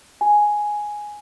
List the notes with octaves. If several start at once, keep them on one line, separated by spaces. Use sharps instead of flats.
G#5